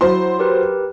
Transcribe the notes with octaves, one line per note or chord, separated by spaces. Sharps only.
F#3 E4 C5 C6
G4 A#4 B4